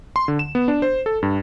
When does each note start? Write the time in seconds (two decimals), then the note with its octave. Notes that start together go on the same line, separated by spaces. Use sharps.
0.16 C6
0.28 D3
0.39 E7
0.55 B3
0.68 D4
0.82 C5
1.06 A4
1.23 G2